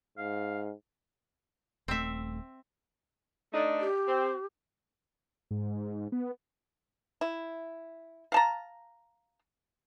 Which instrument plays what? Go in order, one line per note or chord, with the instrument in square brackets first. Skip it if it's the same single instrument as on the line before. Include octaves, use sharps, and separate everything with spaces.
[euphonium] G#2 [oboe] F5
[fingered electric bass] D#1 A3 [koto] C4 E5
[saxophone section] A3 D4 D#4
[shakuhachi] G4
[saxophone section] C4
[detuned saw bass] G#2
B3
[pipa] E4
F5 A5 A#5